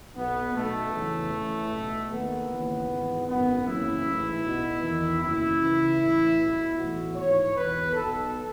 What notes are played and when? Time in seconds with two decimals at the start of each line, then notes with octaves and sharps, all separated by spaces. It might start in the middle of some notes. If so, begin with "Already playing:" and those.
0.16 B1 B2 B3
0.55 B1 B2 A3
0.94 E2 C#3 E3
1.32 A1 A2 E3
1.71 B1 B2
2.09 D#2 D#3 B3
2.49 D#2 C#3 E3
2.88 G#1 G#2 E3
3.27 G#1 F#2 D#3 B3
3.65 F#1 F#2 C#3 E3 E4
4.04 A1 G#2 E3
4.43 B1 B2
4.83 E2 D#3
5.21 F#1 F#2 E3 E4
5.60 C#2 C#3 E3
5.98 A1 A2 E3
6.38 B1 B2
6.76 B1 A2 E3 F#4
7.15 G#1 G#2 E3 C#5
7.54 E2 B2 B4
7.93 B1 B2 A4